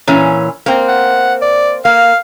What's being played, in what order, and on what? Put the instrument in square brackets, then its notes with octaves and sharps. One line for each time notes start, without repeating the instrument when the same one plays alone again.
[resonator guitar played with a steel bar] A#2 E3 C#4
A#3 C4
[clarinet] F#5
D5
[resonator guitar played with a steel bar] A#3 [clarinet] F5